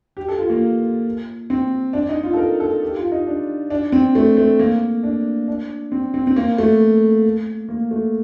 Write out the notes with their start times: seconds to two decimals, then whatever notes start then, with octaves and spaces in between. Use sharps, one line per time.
0.17 G4
0.28 A4
0.39 F4
0.50 A#3
1.50 C4
1.93 D4
2.09 D#4
2.23 F4
2.34 A4
2.37 A#4
2.60 A4
2.83 G4
2.97 F4
3.12 D#4
3.26 D4
3.70 D4
3.92 C4
4.15 A3
4.37 A3
4.59 A#3
5.03 D4
5.48 D4
5.92 C4
6.14 C4
6.27 C4
6.36 A#3
6.58 A3
7.69 A#3
7.91 A3